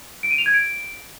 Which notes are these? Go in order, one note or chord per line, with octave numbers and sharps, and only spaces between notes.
D7
D#7
F7
G#6
D7